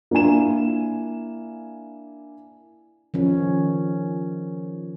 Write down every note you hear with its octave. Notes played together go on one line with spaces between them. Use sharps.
A#3 D4 E4 G#5 E7
D#3 F3 C#4